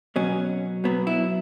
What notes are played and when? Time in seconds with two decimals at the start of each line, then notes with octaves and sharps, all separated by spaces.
0.16 B2 F#3 C#4
0.84 B2 F#3 B3
1.07 E4